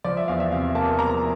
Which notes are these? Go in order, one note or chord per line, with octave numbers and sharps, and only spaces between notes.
F3 D5
E5
E2 F5
E5
C3 F5
A#3 A5
F3 A#5